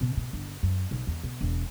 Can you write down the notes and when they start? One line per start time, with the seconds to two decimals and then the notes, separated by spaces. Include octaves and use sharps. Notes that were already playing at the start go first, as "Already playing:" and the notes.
0.01 B2
0.17 B2
0.33 G1
0.63 F#2
0.91 B1
1.07 E2
1.24 B2
1.41 E1